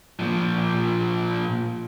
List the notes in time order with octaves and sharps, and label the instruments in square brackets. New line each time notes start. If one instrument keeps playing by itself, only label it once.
[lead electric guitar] A#2 F3